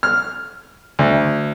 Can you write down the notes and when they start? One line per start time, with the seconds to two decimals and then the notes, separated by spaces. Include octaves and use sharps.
0.03 F6
0.99 D2